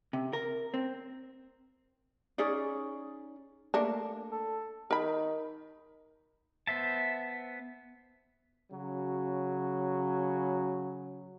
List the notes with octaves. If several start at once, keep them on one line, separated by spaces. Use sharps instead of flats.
C3
A#4
C4
C#4 D#4 G#4 D5
A3 A#3 D4
A4
D#3 A#4 B5
B3 C5 E5 A5
C#3 F#3